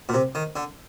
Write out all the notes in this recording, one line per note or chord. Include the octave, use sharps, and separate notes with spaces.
A#2
C3
D#3
D3